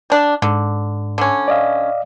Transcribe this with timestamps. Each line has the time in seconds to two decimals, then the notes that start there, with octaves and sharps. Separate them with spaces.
0.10 G3 D4
0.42 G#2 D3
1.18 D3 C#4
1.48 D5 D#5 F5